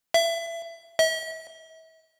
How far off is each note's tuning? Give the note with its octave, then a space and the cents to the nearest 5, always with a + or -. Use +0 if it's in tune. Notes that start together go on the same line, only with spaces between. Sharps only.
E5 +25
E5 -40